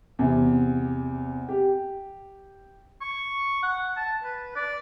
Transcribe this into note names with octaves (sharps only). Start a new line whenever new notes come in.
E2 C3
G4
C#6
F#5
A5
B4
D5